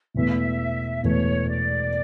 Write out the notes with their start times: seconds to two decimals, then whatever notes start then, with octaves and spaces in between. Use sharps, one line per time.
0.14 E1 E2 B2 A3 E5
1.04 E1 E2 B2 A3 C#5
1.49 D5